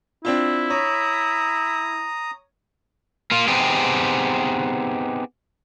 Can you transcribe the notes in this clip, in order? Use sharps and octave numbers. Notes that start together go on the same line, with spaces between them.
C4 D4 E4 F4
C#5 A#5 D#6
A#3 F4
B3 C4 D#4 G4 G#4